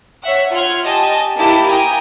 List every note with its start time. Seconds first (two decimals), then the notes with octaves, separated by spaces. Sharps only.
0.23 C#5 E5 F#5
0.52 F4 F#5 C6 F6 G#6
0.83 G4 D#5 G#5 A5
1.37 A#3 E4 G4 A5
1.68 G5 G#5 A#5 D#6